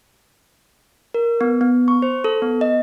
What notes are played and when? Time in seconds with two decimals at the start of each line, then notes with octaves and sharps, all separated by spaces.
1.14 A#4
1.41 B3
1.61 B3
1.88 C#6
2.02 C5
2.24 A4
2.42 B3
2.61 D#5